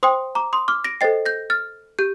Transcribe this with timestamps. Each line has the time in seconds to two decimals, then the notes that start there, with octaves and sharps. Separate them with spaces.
0.03 C5 G5 C6 D#6
0.35 A#5 D6
0.53 C6 D#6
0.68 D6 F6
0.84 A#6 D7
1.01 A4 C5 D#5 G5 A6 C7
1.26 G6 A#6
1.50 F6 A6
1.99 G4 G6